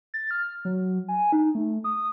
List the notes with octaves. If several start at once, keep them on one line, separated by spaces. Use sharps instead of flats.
A6
F6
F#3
G#5
D#4
A3
D#6